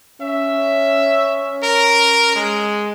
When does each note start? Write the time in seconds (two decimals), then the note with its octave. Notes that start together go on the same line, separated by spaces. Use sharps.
0.21 C#4 E5
1.63 A#4
2.36 G#3